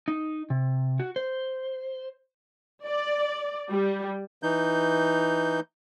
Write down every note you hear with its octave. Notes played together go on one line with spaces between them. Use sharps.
D#4
C3
F#4
C5
D5
G3
E3 D#4 G6